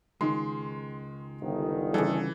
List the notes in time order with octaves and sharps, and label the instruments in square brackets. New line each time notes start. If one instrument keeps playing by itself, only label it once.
[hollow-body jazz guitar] C#2 [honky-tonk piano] D#3 C6 [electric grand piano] G#3
[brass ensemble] G1 D#3
[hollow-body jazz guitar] C#3 G3 [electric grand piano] E3 [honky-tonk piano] G#4 A4